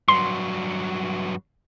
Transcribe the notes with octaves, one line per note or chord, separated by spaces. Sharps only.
G2 F#3 C6